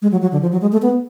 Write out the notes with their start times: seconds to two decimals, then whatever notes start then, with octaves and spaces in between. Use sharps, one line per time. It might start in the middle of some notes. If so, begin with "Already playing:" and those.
0.02 G#3
0.12 F#3
0.22 F#3
0.32 D3
0.42 F3
0.52 F#3
0.61 G#3
0.72 A3
0.82 B3